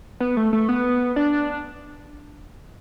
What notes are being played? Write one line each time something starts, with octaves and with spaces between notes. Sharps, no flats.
B3
A3
A3
B3
D4